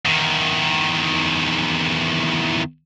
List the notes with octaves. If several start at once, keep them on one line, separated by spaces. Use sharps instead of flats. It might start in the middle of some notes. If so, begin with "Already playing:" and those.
E2 D#3